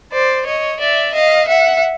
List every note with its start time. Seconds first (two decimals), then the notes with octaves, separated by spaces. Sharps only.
0.11 C5 D5
0.45 C#5 D#5
0.79 D5 E5
1.14 D#5 F5
1.48 E5 F#5